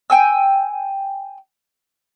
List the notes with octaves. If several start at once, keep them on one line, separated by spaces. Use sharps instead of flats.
G5 G#5 E6